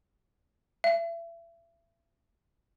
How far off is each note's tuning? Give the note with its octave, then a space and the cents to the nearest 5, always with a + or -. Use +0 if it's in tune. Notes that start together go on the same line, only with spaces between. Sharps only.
E5 +35